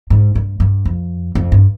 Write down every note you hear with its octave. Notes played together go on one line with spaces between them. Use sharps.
G#2
G2
G2
F2
F2
G2